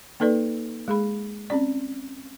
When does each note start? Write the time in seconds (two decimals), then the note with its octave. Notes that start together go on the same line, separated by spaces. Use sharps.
0.20 A#3 D#4 A4 B4 D5
0.88 G#3 G#4 B5
1.50 C4 C#4 D5